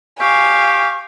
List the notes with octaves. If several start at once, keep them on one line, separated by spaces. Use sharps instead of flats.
G4 F5 G#5 C#6